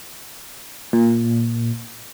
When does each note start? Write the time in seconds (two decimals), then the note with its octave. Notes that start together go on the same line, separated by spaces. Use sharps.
0.93 A#2